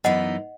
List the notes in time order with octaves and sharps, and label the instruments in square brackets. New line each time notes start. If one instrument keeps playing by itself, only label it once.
[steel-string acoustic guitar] F#2 E3 B3 D#4 [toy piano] D#5 F#5